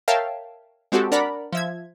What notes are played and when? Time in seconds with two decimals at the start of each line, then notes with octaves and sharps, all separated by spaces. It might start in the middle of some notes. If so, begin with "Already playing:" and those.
0.08 A#4 C#5 E5 F5 G5 A5
0.92 G#3 C4 F#4 G4 A4
1.12 D4 A#4 D5 F#5 A#5 B5
1.52 F3 E5 G#6